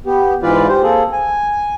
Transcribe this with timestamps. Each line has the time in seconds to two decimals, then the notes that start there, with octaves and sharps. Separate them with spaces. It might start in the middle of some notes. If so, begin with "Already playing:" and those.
0.06 B3 G4
0.43 G#2 E3 F4 B4 D5
0.69 G4 C5
0.83 A#3 C4 G#4 A4
1.13 G#5